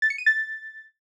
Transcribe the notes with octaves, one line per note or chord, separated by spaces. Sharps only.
A6
C#7
D#7
A6